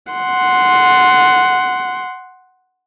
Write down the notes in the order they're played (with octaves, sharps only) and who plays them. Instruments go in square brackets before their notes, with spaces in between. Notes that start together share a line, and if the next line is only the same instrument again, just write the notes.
[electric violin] F#5 C6